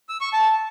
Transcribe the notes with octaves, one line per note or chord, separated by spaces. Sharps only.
E6
C#6
A5